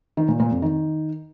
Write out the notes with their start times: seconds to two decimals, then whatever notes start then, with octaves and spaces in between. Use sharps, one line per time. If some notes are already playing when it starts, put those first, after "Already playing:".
0.17 D#3
0.28 A#2
0.40 A#2
0.51 F2
0.62 D#3